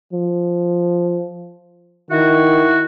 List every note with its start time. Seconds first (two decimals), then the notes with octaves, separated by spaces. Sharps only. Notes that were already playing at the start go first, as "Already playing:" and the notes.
0.13 F3
2.11 D#3 E4 F#4